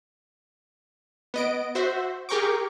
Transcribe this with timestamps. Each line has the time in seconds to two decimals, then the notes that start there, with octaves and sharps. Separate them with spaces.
1.34 B3 D#5 D7
1.75 F#4 C5 E5
2.29 G4 G#4 A#4 G5 C#6 D6